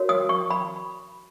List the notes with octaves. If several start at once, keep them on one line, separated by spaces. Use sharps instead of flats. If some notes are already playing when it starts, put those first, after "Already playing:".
Already playing: F#4 A#4 C#5
D#6
C#6
B5